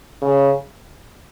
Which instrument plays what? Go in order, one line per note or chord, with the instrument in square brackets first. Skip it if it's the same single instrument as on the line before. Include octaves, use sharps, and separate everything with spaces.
[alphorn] C#3